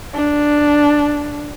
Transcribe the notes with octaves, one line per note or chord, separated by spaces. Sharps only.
D4